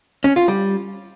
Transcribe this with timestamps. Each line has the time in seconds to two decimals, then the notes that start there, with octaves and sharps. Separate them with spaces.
0.24 C#4
0.36 F4
0.48 G3